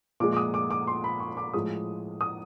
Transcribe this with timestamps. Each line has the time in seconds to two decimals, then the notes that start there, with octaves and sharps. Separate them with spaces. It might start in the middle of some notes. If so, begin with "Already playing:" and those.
0.20 A#2 F3 G#3 D6
0.33 D6
0.37 D#6
0.54 D6
0.71 D6
0.87 C6
1.04 B5
1.20 C#6
1.37 D6
1.54 A2 F3 G#3 D#6
2.21 D#6